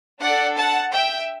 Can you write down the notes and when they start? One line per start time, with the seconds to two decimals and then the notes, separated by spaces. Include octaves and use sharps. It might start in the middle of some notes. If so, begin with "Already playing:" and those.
0.20 D4 A4 D5 F#5
0.57 F#5 A5
0.94 E5 G5